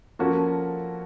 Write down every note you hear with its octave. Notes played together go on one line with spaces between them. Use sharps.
F3 A#3 C#4 F#4 A4